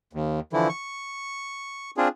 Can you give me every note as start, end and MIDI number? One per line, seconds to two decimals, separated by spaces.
0.13 0.40 39
0.53 0.68 50
0.53 0.68 52
0.53 0.68 53
0.53 0.68 64
0.69 1.91 85
1.97 2.08 60
1.97 2.08 62
1.97 2.08 65
1.97 2.08 68